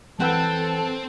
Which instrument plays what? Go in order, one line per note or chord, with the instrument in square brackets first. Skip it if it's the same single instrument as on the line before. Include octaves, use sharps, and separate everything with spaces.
[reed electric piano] E3 B4 E6 [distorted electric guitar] C4 [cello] A4 [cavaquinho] F#5 G5 B5